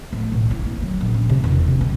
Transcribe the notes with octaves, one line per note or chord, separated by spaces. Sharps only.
A2
B1
E4
A#3
F#3
A#1
D4
C3
E1
C3
B1